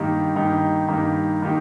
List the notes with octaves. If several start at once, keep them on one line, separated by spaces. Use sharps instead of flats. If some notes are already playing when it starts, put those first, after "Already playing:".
Already playing: G2 D#3 A#3 D#4 G4
G2 D#3 A#3 D#4 G4
G2 D#3 A#3 D#4 G4
D#3 A#3 D#4 G4